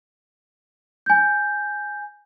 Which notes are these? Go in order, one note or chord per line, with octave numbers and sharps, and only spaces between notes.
G#5 G6